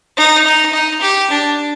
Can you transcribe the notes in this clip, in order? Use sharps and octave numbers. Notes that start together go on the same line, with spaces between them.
D#4
D#4
D#4
G4
D4